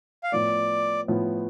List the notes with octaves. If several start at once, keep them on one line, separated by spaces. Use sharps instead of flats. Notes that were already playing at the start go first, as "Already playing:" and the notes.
F5
A2 F3 B3 D5
A2 F3 B3